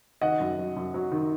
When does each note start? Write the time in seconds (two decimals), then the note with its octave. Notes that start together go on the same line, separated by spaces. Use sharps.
0.21 D#3 D#5 F#5
0.40 F#2
0.59 F#3
0.76 F#2
0.94 F#3
1.12 D#3